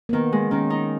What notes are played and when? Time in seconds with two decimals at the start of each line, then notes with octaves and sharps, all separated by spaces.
0.09 A#3
0.13 D#3 B3
0.32 G#3
0.51 D#3 C#4
0.70 D#4